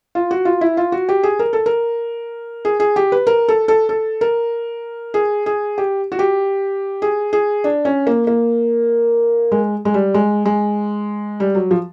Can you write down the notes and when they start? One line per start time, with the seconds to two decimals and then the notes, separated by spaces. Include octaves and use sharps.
0.15 F4
0.31 F#4
0.45 F4
0.61 E4
0.77 F4
0.92 F#4
1.09 G4
1.23 G#4
1.39 A#4
1.53 A4
1.66 A#4
2.65 G#4
2.80 G#4
2.96 G4
3.12 B4
3.27 A#4
3.48 A4
3.68 A4
3.89 A4
4.21 A#4
5.14 G#4
5.46 G#4
5.78 G4
6.12 F#4
6.19 G4
7.02 G#4
7.33 G#4
7.64 D4
7.85 C#4
8.07 A#3
8.27 A#3
9.52 G#3
9.85 G#3
9.94 G3
10.14 G#3
10.45 G#3
11.40 G3
11.55 F#3
11.71 F3